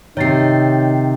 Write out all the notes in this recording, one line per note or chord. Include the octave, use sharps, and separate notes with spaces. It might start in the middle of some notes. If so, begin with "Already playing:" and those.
C3 D#3 D#4 C#5 A6 C7